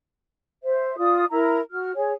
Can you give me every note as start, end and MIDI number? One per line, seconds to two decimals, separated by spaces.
0.63 0.94 72
0.63 0.94 76
0.98 1.25 65
0.98 1.25 74
0.98 1.25 87
1.32 1.60 64
1.32 1.60 70
1.32 1.60 82
1.71 1.91 66
1.71 1.91 89
1.95 2.13 68
1.95 2.13 73